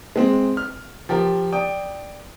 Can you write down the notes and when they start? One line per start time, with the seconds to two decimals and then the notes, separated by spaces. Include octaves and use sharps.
0.16 G#3 C4
0.57 F6
1.09 F3 G4 A#4
1.52 D5 G5 D#6